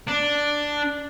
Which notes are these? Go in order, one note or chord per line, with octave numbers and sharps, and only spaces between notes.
D4